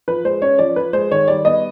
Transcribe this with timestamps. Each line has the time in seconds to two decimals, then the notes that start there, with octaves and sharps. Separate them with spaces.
0.08 F3 B4
0.24 G#3 C5
0.42 C#4 C#5
0.59 F3 D5
0.76 F3 B4
0.93 G#3 C5
1.11 D#3 C#5
1.28 G3 D5
1.45 B3 D#5